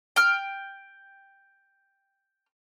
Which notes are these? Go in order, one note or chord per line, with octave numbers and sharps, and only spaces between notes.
G5 F6